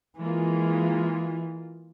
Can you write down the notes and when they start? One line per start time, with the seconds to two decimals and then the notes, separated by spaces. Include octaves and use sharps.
0.19 E3 G#3 A#3 F4